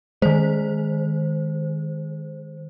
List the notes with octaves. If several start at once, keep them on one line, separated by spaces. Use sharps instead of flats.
D#3 G#3 C5